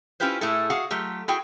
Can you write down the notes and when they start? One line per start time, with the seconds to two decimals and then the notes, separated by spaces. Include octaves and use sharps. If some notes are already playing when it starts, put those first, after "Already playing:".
0.20 C#4 E4 F4 G4 B4 C5
0.41 A2 A3 E4 G#4 A4
0.70 F#4 G#4 F5 F#5
0.91 F#3 A3 F4 G4
1.28 E4 F#4 G#4 G5